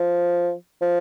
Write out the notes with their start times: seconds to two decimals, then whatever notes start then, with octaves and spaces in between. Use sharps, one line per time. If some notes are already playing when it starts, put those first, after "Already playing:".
Already playing: F3
0.81 F3